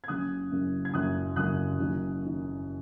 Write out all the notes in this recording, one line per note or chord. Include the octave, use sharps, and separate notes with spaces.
G#6
F#1 F#2 C#3 D#6 F#6
F#1 F#2 C#3
G#6
F#1 F#2 C#3 D#6 F#6
F#1 F#2 C#3 D#6 F#6
F#1 F#2 D#3
D#3